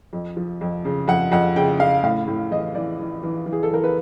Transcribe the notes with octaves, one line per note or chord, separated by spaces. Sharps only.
F2
F3
F2
C#3
F2 F#5
F2 F#5
C#3 G5
C#3 F5
A2 F5
A2
E3 D#5
E3 D5
E3
E3
E3
G#4
A4
E3 A#4
B4